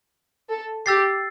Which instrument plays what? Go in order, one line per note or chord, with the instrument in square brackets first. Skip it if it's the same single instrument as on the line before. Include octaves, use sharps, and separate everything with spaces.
[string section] A4
[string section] G4 [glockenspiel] E6 A6 C7